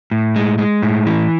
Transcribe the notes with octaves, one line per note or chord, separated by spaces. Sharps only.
A2
G#3
G#3
A2
E3